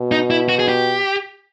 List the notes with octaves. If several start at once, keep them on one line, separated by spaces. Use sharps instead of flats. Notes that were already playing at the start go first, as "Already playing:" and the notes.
Already playing: B2
D#4
E4
F#4
G#4
G4